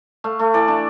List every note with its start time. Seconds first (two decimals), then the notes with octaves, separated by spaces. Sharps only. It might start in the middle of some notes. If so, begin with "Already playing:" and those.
0.24 A3 F5
0.39 A3
0.54 E3 D5
0.68 D4